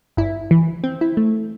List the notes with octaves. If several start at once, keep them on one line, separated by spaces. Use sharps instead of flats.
G1 E4
E3
C4
E4
A3